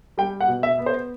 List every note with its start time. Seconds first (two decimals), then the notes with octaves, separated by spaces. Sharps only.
0.18 G3 G5
0.41 F#5
0.48 B2
0.63 E5
0.79 B3
0.86 C5